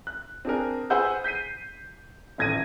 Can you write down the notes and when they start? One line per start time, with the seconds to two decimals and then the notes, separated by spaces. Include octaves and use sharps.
0.07 F#6
0.45 C4 D4 G#4 A#4
0.90 G#4 B4 C5 F#5 E6 G6
1.24 G6 B6 C7 D#7
2.38 D#1 A1 G#6 A#6 D#7